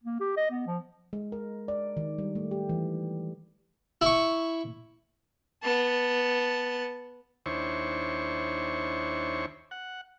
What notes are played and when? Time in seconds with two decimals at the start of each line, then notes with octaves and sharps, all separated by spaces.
0.03 A#3
0.20 G4
0.37 D#5
0.51 B3
0.67 F3
1.13 G#3
1.32 A#4
1.68 D5
1.97 D#3
2.18 G3
2.35 A3
2.51 G4
2.69 E3
4.01 E4 C#6
5.63 B3 A5
7.46 D#2 D4 E4 C5 C#5 C#6
9.71 F#5